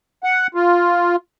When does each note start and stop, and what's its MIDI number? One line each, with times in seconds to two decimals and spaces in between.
0.24 0.47 78
0.55 1.16 65